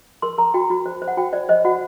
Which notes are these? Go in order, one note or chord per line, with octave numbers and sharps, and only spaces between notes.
A#4 C6
A#4 A#5
F#4 G5
F#4
C5
C5
F#5
F#4 G5
C5 D5
C5 D#5
F#4 F#5